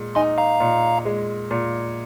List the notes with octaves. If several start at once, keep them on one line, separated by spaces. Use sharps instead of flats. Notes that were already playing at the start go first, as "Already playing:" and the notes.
Already playing: A#2 G#3
D#4 G#5 C6
F5 A#5
A#2
G#3
A#2